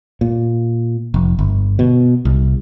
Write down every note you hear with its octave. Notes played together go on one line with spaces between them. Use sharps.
A#2
F1
G1
B2
C2